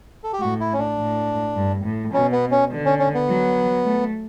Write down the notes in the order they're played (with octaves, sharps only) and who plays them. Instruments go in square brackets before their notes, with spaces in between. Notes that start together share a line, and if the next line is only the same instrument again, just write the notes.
[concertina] A4
G4
[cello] A2 [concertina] F#4
[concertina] E4
C#4
D4
[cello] A2
G2
A2
[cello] B2 [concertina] C#4
[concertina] B3
C#4
[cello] D3
[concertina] C#4
C#4
B3
[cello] F#3
A3